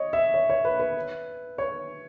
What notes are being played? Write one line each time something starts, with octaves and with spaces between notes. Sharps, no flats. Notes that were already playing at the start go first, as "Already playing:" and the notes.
Already playing: C#5 D#5
E5
C#5
C#5
B4
B4
C#5